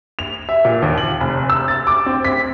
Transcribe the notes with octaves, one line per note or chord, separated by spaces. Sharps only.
F7
E5
A#2
D#2
F#7
F1
E6
A6
D6
C4
B6